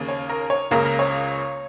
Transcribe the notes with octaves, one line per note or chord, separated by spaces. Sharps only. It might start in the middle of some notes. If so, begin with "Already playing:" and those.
Already playing: D#2 C#3 A#3
C#5
A#4
C#5
C#2 C#3 A#3 A#4
A#4
C#5